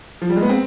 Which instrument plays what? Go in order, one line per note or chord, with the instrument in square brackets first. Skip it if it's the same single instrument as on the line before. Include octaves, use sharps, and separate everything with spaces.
[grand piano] F3
G3
G#3
B3
C4